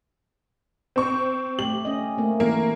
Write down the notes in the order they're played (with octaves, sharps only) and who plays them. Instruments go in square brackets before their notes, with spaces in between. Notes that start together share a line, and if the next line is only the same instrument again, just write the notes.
[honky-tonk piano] C4 C#6
[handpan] A3 G4 [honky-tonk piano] F#7
[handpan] C#4 D#5
A3 A#3 C4
[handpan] E3 A#4 [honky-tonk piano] A#3